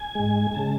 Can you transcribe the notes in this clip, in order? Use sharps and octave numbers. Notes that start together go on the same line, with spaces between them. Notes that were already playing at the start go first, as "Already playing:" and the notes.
Already playing: G#5
G#2 G#3
C#3 G#3 A5